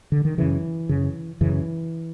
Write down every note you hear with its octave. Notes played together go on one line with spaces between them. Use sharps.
D3
D#3
F#2 C#3 E3
F#2 C#3
F#2 C#3 E3